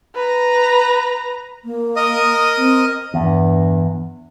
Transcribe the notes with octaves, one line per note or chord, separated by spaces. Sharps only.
B4 A#5
A#3
A#4 D#5 D#6
C4
E2 G2